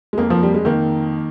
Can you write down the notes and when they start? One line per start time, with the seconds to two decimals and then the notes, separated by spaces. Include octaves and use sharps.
0.13 G#3
0.18 F2 A#3
0.30 F3
0.43 G3
0.54 G#3
0.65 D#3 A#3